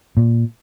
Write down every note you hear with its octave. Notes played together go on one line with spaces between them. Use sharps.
A#2